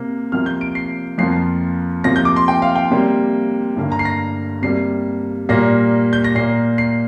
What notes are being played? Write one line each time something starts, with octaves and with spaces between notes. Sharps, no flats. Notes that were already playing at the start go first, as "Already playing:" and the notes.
Already playing: C3 A#3
C3 F3 A#3 F6
G6
D7
C7
F2 F3 A#3 C7
C3 F3 A#3 A#6
G6
D6
C6
G5
F5
G5
C3 G3 A#3
G2 D3 A#3
A#5
C7
A#6
C3 G3 A#3 C7
A#2 G3 A#3 A#6
G6
A#6
A#2 A#3 C7
C7